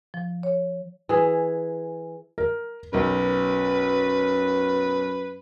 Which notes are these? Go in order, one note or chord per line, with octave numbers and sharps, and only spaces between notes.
F3
C#5
E3 G#4
A#4
B1 F#2 A#4 B4